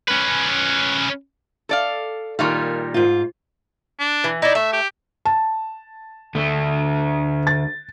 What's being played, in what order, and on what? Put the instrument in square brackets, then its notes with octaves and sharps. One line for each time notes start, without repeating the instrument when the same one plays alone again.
[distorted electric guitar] C#4 B4
[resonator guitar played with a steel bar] A4 D5 F5
[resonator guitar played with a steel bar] A#2 D#3 G3 [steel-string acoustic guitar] F5
[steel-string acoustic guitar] G#2 F4
[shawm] D4
[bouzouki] E3
[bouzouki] D#4 D5 [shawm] E4
[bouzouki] A3 [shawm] E5
[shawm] G4
[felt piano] A5
[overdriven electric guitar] D2 A3
[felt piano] A6